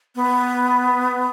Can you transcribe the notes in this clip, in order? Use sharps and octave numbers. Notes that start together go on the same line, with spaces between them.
B3